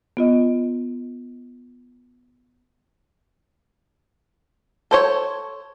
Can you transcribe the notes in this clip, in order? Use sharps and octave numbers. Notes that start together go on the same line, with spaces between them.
B3 F4 D#5
A4 C5 C#5